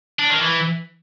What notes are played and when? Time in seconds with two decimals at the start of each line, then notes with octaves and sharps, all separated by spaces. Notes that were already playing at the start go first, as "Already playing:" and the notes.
0.19 D4
0.30 D#3
0.41 E3